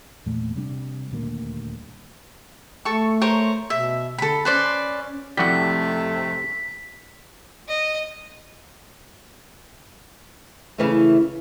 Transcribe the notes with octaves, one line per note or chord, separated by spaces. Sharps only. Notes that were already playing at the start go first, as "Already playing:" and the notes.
E2 A#2 A3
C3 G3 D4
D#1 D2 A#3
A3 A4 C#6
A#4 C5 C#5
B2 E5
D3 A4 B5
C#4 B4 C5 D5
F2 A2 C3 G3 A3 F#4 F#5 B6
D#5
C#3 E3 A3